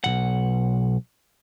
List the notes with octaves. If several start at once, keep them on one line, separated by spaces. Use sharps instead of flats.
B1 C#3 F#5